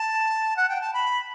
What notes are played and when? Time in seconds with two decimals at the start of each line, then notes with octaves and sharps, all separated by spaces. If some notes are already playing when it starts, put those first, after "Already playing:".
Already playing: A5
0.57 F#5
0.69 G5
0.81 A5
0.94 B5